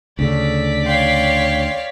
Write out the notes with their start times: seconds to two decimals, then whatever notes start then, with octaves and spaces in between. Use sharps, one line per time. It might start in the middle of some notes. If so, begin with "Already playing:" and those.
0.19 D2 C#3 A4 D5 B6
0.86 C#5 F5 G5 C6